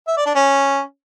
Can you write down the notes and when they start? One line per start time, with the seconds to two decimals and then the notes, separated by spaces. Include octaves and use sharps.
0.08 E5
0.17 D5
0.26 D4
0.35 C#4